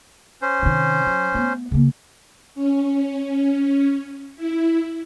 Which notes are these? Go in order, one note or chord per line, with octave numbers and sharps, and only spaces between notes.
C#4 C5
C3 D#3
F#3
A3 B3
C#3 A#3
C#4
E4